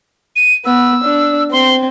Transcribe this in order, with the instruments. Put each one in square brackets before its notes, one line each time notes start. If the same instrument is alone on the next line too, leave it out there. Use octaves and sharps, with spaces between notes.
[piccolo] D#7
[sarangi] B3 [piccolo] E6
[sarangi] D4
[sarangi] C4 [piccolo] C6